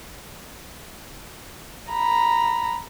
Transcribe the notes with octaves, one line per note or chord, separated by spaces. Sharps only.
A#5 B5